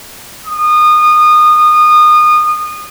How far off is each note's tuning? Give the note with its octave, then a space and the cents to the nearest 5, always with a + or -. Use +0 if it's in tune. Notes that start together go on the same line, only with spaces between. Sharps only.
D#6 -25